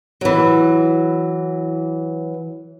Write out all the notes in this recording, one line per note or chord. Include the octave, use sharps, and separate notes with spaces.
E3 F#3